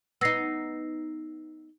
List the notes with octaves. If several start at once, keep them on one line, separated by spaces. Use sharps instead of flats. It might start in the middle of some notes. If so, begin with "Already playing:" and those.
B3 D#4 E6 A#6 C7